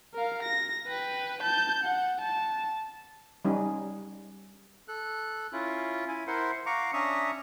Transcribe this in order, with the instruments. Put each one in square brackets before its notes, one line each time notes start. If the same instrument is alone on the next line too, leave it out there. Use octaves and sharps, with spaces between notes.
[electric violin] A#4 F5
A#6
B4 G5
A5 G6
F#5
A5
[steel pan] G3 C#4 D#4
[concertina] A4 F#6
C#4 E4 F4
E4 G#5
E4 A#4 C5 F#5 C6
F5 F#5 A#5 C#6 D6
C#4 D4 E5 A#5 C#6 D#6